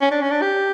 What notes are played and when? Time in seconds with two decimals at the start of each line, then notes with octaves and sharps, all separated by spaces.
0.01 C#4
0.11 D4
0.22 C#4
0.31 D4
0.42 G4